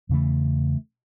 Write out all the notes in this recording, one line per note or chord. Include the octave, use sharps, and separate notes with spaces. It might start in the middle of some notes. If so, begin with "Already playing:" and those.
E2 C#3 E3 A3